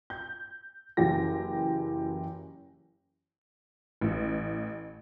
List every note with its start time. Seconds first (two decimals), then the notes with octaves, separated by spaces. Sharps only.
0.10 G6
0.97 F#1 E3 G4 A#6
4.01 A1